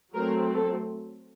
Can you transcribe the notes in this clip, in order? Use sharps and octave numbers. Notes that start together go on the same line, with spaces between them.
F#3 A3 C4 A#4
A4